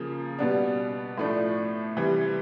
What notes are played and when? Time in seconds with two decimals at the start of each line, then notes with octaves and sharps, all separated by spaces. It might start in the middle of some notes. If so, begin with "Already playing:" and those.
Already playing: C#3 F3 A#3
0.39 B2 G3 B3 D4
1.18 A2 F3 A3 D4
1.97 C3 E3 G3